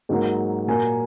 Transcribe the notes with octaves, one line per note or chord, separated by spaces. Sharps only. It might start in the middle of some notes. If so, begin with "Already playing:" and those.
G#2 F#3 A#3
A#2 F#3 A#3 G#5